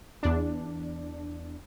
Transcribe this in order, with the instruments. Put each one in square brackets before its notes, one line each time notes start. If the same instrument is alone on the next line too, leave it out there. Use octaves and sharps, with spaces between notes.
[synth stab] E2 D4